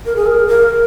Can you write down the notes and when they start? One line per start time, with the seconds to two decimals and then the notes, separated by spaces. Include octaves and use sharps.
0.06 A#4
0.16 G#4
0.26 A#4
0.48 A#4